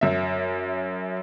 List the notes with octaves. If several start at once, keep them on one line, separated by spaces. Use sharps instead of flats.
F#2 E5